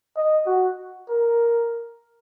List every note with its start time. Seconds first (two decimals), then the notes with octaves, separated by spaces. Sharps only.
0.17 D#5
0.47 F#4
1.09 A#4